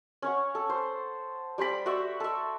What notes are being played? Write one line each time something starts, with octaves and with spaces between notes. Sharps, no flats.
C#4 C#5 F#5
A4
C5
G3 C5 D5 B5
F#4 D5 E5
A4 E5